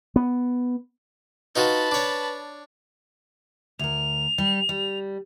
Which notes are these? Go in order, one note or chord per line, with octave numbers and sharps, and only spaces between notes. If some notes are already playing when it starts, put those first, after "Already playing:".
B3
D#4 F4 F#4 B4 A5 B5 C#6
D4 C#5
D2 A#4 F7
G3
G3